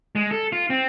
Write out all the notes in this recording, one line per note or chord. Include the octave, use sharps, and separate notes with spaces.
G#3
A4
F4
C4